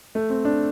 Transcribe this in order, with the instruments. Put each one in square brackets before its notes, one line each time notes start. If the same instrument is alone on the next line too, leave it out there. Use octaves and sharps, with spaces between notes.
[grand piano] A3
C4
D4